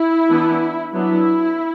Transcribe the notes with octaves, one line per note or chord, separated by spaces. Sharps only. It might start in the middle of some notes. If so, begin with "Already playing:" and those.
Already playing: E4
E3 B3 D4
F#3 B3 D4 E4